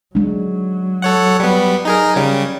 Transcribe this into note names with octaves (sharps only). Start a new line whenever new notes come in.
F#3 G#3 D4
A4 C#5 F#5
G3 B3
D#4 G#4 A#4
C#3 G3